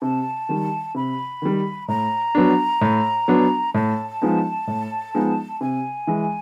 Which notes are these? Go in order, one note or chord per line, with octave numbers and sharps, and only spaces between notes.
C3 A5
D#3 G3
C3 B5
D#3 G3
A2 A#5
F#3 B3 D4
A2
F#3 B3 D4
A2 A5
F3 G#3 B3 D#4
A2
F3 G#3 B3 D#4
C3 G#5
E3 G#3